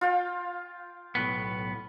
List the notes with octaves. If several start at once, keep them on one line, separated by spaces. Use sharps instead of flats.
F4 F5 G5
B1 A2 B3